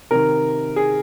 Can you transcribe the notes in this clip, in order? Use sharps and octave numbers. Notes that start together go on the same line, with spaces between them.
C3 D#3 A#4
G#4